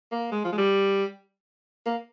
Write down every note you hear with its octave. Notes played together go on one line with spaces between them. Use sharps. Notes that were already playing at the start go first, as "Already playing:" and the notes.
A#3
G#3
F3
G#3
G3
A#3